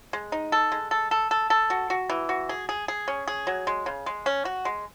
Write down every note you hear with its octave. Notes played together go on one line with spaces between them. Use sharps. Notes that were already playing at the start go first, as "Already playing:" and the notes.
G#3
D#4
A4
G#3
A4
A4
A4
A4
F#4
F#4
E3
F#4
G#4
G#4
G#4
C#4
G#4
F#3
G#3
C#3
G#3
C#4
F#4
G#3